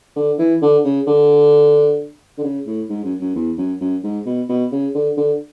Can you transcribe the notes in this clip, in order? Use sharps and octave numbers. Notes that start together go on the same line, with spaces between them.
D3
E3
D3
C#3
D3
D3
C#3
A2
G#2
F#2
F#2
E2
F#2
F#2
G#2
B2
B2
C#3
D3
D3